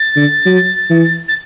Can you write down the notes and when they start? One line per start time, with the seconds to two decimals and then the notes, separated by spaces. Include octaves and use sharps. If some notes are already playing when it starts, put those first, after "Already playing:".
Already playing: A6
0.16 D3
0.46 F#3
0.90 E3
1.28 A6